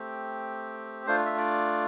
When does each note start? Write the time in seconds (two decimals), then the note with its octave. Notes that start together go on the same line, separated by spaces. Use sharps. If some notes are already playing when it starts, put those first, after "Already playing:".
Already playing: A3 C4 G4
1.06 A3 D4 F4 C5
1.26 E5
1.37 D5